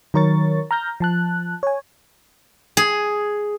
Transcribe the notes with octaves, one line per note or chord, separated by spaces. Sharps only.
D#3 F#3 A#4 C#5 C#6 A6
A#5 F6 G6 A#6
F3 A5 F#6
C#5 G#5
G#4